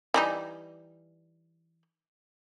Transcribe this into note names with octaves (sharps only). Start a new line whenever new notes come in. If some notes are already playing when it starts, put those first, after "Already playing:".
E3 G3 D#4